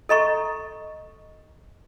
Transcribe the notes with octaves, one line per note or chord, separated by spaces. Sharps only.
A4 D#5 A#5 C#6